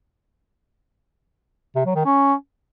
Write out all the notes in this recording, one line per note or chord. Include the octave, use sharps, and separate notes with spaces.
C3
F#3
D#3
C#4